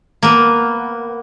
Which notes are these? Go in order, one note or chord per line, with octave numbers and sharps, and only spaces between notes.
A#3 B3